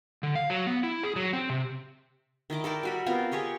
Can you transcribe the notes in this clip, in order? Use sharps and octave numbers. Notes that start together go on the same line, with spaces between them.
D3
F5
F#3
B3
E4
G#4
F#3
C4
C3
D#3 E4 D#5 D6
A4 A#4 D5 G5
G3 F#4 B5
B3 C4 F4 A#4
G4 G#4 C#5 D#5